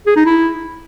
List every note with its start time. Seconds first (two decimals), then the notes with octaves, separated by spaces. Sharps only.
0.07 G#4
0.16 D#4
0.26 E4